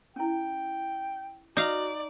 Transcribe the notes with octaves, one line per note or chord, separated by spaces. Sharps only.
C#4 E4 G5
D#4 F#4 D5 F5